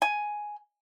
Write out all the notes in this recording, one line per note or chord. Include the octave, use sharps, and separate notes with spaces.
G#5